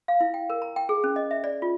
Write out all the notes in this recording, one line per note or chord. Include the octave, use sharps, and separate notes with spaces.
F5
E4
G5
A#4
A#5
G5
G#4
C#4
D#5
E5
D5
F4